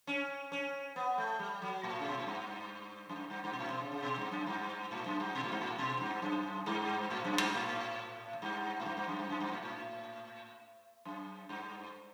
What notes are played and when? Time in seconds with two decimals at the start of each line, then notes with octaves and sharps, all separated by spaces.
0.07 C#4
0.52 C#4
0.96 B3
1.18 A3
1.39 G3
1.62 F#3
1.83 A2
1.99 C#3
2.08 B2
2.18 A2
2.27 G2
3.09 F#2
3.15 G2
3.30 G2
3.44 G2
3.53 B2
3.59 A2
3.70 B2
3.80 C#3
3.92 C#3
4.03 B2
4.18 G2
4.32 F#2
4.46 G2
4.91 A2
5.06 F#2
5.20 G2
5.35 B2
5.43 A2
5.52 G2
5.61 A2
5.78 B2
6.01 G2
6.22 F#2
6.66 G2
7.10 A2
7.25 F#2
7.40 G2
7.54 A2
8.42 G2
8.80 A2
8.85 G2
8.97 G2
9.08 F#2
9.19 G2
9.29 F#2
9.40 G2
9.52 A2
9.63 A2
11.05 F#2
11.49 G2